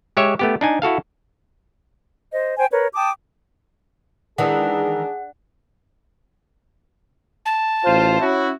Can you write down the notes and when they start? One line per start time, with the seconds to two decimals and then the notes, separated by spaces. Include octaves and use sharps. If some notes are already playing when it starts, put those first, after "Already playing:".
0.17 G#3 G4 C#5 E5
0.39 A3 B3 G4
0.61 D4 D#4 G#5
0.82 E4 F#4 A4 F5
2.32 C5 D#5
2.57 C5 G5 G#5
2.72 A#4 B4 C#5
2.94 G5 A5 D6 D#6
4.38 D#3 E3 G#3 D4 G#4 F#5
7.46 A5
7.85 A1 F4 C5
8.20 C#4 E4 F#4